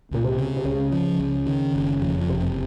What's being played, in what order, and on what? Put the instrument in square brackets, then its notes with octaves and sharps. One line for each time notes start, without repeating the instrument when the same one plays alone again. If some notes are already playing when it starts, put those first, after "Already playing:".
[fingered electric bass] C#2 [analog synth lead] A#2
[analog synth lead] C3
[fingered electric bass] C#3
[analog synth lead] C3
[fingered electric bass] C#2 [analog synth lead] C#3
[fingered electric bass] F3
C#2
D#3
F#1
F2
[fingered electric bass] F#1 [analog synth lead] C3